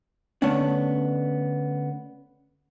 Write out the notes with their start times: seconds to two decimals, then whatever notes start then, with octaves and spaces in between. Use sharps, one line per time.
0.42 D3 A3 B3 C#4 D4